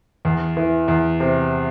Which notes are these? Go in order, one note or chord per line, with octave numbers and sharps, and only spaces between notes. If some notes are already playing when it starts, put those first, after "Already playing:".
E2
E3
E2
C3